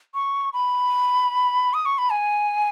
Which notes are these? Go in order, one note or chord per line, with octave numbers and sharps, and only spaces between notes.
C#6
B5
D#6
C#6
B5
G#5